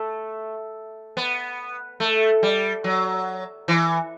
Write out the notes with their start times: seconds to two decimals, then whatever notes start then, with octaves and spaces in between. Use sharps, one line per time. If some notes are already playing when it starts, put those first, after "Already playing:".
Already playing: A3
1.17 B3
2.00 A3
2.43 G3
2.84 F#3
3.68 E3